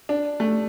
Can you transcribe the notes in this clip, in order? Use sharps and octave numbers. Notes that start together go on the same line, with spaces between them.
D4
A3